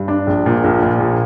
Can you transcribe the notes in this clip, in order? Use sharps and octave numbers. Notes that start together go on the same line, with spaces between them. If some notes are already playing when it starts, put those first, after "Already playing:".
Already playing: G2
D4
A#1
A#2
A#1
A#1
A#2